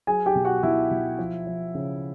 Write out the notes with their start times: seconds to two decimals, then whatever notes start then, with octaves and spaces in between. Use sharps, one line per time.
0.07 F#3 G#4 G#5
0.26 G4 G5
0.35 B2
0.45 F#4 F#5
0.63 B2 E4 E5
0.91 B2
1.19 F3
1.47 F3
1.75 C#3